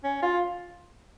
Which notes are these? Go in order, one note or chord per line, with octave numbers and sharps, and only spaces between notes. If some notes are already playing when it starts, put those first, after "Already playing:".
C#4
F4